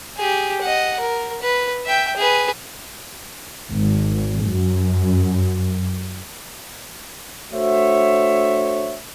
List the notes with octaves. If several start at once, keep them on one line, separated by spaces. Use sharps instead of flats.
G4 G#4
D#5 F#5
A#4
B4
E5 G5
G#4 B4
G#1
F#2
A3 D4 F#4 C5 C#5 E5